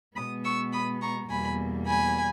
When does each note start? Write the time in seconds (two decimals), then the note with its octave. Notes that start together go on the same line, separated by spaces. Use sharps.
0.16 B2 G#3 B3 B5 D#6
0.44 C#6 E6
0.73 B5 D#6
1.02 A#5 C#6
1.30 E2 B2 G3 A#3 G#5 B5
1.87 G#5 B5